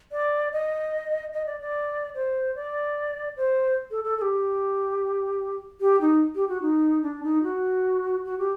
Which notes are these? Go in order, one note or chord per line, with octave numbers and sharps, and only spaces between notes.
D5
D#5
D#5
D5
D5
C5
D5
C5
A4
A4
A4
G4
G4
D#4
G4
F#4
D#4
D4
D#4
F#4
F#4
G4